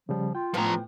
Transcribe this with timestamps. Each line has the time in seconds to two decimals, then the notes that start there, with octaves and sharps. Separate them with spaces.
0.09 C#3 F3 G3
0.35 F4 G5
0.54 A2 F3 B3 C#4 A#5